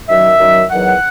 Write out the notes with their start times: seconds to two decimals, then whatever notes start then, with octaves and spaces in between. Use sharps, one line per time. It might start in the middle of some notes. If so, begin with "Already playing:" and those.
0.08 F#2 D#3 F#3 E5
0.39 F#2 D#3 F#3
0.70 E2 D#3 F#3 F#5